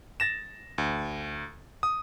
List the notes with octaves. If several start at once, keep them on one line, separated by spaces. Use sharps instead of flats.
A6 A#6 E7
D2
D#6